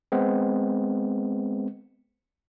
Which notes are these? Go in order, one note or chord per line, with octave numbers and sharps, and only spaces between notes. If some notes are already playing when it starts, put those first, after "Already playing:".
G#3 B3 C4